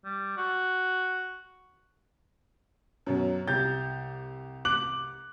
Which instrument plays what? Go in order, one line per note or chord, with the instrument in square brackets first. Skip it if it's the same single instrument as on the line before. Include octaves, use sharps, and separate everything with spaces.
[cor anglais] G3
F#4
[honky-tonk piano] F#2 B2 F#3
[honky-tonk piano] C2 G4 A6 [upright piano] G6
[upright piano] D6 F#6 F#7